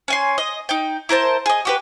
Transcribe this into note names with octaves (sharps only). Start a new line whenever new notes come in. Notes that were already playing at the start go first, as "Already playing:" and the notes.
C#4 G#5 C6
D#5
D#4 G5
E4 A#4 C5 A5
G#4 D#5
F#4 G4 B4